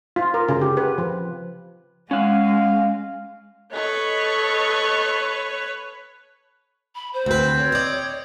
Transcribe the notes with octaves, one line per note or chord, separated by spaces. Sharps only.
F4
A#4
C#3
G4
B4
F3
G#3 C#4 F5 F#5
A4 B4 C#5 D#5 C#6
B5
C5
D2 C4 B4
C#5
D5 D#5